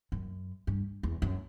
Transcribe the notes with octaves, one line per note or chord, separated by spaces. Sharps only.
F#2
G2
E2
F#2